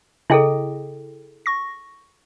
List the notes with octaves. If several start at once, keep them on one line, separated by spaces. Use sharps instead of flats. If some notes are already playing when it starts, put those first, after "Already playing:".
C#3 E4 G#4 A4 D#5 G5
C#6 A#6